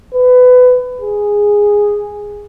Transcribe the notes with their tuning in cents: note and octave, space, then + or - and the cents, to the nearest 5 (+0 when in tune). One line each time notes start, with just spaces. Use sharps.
B4 +20
G#4 -10